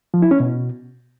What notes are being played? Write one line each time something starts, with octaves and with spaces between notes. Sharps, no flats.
F3
E4
C#4
B2